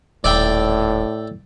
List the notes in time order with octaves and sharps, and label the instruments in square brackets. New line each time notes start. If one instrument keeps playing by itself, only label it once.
[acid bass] D#1 [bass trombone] A2 [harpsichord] D5 E5 G5